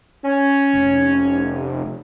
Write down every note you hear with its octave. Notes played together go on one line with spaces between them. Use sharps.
C#4
F1